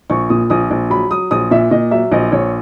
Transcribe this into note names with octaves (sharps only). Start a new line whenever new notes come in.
A#1 C#6
A#2 D#6
A#1 D#6
A#1
F#3 B5
F#3 D#6
A#1 D#6
A#2 E5
A#2 D#5
F#3 E5
A#1 D#5
A#1 C#5